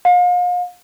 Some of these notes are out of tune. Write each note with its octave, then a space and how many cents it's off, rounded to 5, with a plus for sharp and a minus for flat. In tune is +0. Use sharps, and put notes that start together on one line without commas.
F5 +40